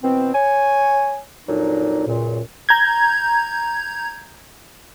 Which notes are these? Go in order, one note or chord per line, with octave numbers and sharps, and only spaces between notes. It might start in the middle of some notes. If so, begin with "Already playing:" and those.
B2 E3 B3 C4
C#5 G#5
F2 A#2 F#3 D4 D#4
C#2 F#2 A#2
A#5 G6 G#6